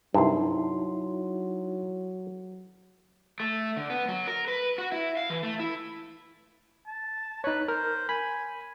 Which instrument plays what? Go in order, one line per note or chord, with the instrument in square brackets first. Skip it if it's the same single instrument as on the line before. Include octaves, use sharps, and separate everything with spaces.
[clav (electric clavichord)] C2 G2 [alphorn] F#3 [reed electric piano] D#4 E4 C6
[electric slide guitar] A3
D3
B3
F#3
A#4
B4
F#4
E4
F5
E3
A3
E4
[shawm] A5
[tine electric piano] D#4 C#5 [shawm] B4
[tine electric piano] A#4 [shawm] C5
[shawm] G#5 [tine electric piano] B5